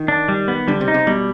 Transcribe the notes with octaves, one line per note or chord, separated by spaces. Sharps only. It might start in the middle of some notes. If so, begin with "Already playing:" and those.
Already playing: D#3
D4
G3
B3
D3 G3
C3
D#4
C3
B2 G3